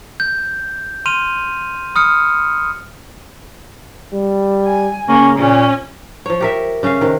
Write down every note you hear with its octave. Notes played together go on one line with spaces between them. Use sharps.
G6
C6 F6 D#7 F7
B5 D#6 F6 C#7
G3
G#5
C#3 A#3 C#4
A#2 C#4
F3 C#5
G4 A#4 E5
C#3 C#4 E5 F5
C3 D#3